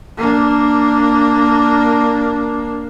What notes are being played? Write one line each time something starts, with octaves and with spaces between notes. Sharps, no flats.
A#3 D4